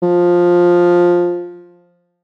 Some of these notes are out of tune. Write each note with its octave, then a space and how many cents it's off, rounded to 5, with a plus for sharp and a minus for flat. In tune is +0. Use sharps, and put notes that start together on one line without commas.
F3 +10